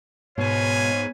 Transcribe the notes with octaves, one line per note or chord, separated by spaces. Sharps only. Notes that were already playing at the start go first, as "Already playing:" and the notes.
G#2 B2 F4 B4 C#5 G#5